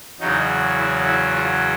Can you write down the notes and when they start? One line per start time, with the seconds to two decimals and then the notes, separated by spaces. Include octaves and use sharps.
0.20 E2 C#3 F#3 D#4
0.77 E4
1.05 E4
1.34 F4